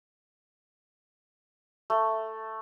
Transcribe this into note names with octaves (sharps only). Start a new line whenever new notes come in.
A3